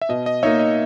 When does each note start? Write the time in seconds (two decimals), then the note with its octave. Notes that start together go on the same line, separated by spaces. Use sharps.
0.02 E5
0.09 B2 D#5
0.26 D#5
0.43 A#3 D#4 C#5 E5
0.59 D#5